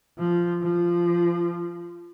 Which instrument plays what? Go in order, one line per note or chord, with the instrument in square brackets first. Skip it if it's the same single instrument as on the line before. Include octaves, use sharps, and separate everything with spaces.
[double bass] F3
F3